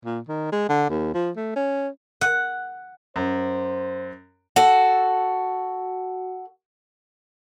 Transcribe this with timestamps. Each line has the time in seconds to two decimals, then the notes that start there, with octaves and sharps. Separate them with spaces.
0.05 A#2
0.28 D#3
0.52 G#3
0.69 D3
0.90 D#2
1.14 F3
1.37 A3
1.56 C#4
2.21 F#5
3.16 F#2 C5
4.56 F#4 A4